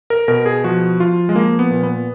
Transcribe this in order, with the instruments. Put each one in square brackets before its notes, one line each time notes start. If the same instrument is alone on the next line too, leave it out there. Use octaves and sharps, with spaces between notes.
[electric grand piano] A#4
B2 A#4
G#4
F3 F#4
F3 F4
G#3
F3 A#3
B3
A#2
B3